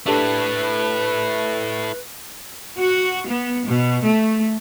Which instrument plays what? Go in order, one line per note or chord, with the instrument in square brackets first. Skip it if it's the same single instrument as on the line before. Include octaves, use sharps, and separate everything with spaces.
[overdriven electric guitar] A3 E4 [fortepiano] D4 G4 A4 [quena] B4
[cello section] F#4
B3
B2
A3